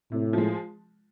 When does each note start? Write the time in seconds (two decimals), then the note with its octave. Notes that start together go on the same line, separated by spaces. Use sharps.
0.11 A2 C3
0.33 F3 G#3